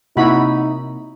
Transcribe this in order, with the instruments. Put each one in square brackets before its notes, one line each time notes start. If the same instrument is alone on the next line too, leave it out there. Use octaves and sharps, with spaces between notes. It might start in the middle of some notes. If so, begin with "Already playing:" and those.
[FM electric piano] C3 A#3 [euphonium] D#4 [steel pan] E4 F#4 B5